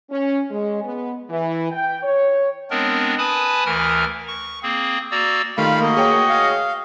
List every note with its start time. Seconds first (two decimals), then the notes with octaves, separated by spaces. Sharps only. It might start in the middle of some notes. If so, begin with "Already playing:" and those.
0.10 C#4
0.50 G#3
0.82 B3
1.30 E3
1.71 G5
2.03 C#5
2.71 G#3 B3 C4 D4 A#4
3.18 B4 G#5 A5 B5 D#6
3.66 D2 E3 A#4 F6
4.27 C#6
4.63 A#3 C4 G#4
5.11 A#3 F#4 D5 A#5 E6
5.58 D#3 G3 A3 F4 F5 B5
5.81 A#3 F#4 D#5
5.97 G#4 C#5 G5
6.30 F5